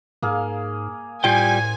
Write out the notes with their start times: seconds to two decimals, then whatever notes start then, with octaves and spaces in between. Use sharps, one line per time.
0.22 G#2 A#3 G#4 F5
1.24 A2 G3 F4 C5 G5 G#5